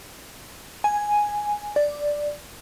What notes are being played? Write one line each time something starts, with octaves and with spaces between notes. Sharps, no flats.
G#5
D5